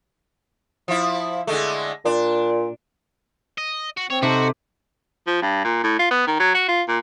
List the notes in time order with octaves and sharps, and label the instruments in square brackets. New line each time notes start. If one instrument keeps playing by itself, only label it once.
[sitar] F3 E4
D3 G#3 A3
[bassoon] A#2 [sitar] D4
[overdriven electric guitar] D#5
F#4
[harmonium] C4 [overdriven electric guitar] C#5
[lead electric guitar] C3 [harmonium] D#4 A4 C5 [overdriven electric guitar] F#4
[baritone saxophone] F3
G2
A#2
A2
F4
B3
D#3
F#3
F#4
F4
A#2